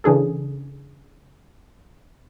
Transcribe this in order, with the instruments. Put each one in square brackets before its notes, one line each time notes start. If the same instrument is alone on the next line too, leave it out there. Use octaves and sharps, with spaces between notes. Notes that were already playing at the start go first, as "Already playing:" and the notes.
[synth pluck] C#3 E3 D4 G#4 A4